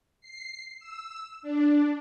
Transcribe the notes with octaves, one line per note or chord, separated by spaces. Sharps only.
C7
E6
D4